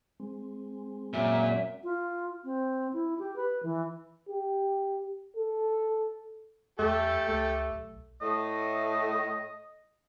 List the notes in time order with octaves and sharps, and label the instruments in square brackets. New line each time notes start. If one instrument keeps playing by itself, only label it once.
[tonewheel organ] G#3 C4
[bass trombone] F#2 [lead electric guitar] A#2 [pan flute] E5
[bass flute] F4
C4
E4
G4
B4
E3
[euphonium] G4
A4
[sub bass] E2 [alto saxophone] A3 [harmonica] G4 A4
[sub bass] C#2 [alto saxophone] A3
[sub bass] B1
[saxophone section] A2 A3 [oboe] D#5